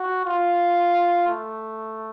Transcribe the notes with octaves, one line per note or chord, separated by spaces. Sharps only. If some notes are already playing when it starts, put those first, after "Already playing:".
Already playing: F#4
F4
A3